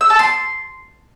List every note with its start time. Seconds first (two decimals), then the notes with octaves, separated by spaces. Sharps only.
0.01 E6
0.10 A5
0.19 C6